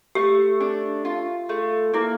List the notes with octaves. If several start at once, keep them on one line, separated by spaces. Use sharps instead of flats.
A3 G4
D4
F4
A3
A#3 E4